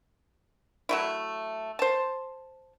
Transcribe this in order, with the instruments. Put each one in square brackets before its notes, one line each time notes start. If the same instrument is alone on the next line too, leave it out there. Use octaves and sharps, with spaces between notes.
[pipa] F#3 A3 E4
C5 A5